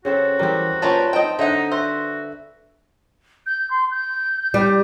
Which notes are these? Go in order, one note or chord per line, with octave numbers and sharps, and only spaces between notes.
C#3 C4 F#4 A4
E3 G3 C4 A#4
A#2 A#3 C#4 B4 C5 G5 A5
C4 D#4 D#5 G5
D3 D#4 E5 F#5
F#4 B4 C5 E5
G6
C6
G6
G3